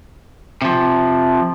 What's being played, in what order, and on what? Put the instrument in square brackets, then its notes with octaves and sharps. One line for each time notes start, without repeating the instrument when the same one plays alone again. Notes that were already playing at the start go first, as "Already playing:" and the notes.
[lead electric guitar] C3 F3